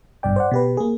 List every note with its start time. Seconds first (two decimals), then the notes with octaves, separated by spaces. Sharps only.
0.23 G#1 G2 B2 D5 G5
0.36 C5 D5 F#5
0.51 B2 G4 B4
0.77 A#3 G#4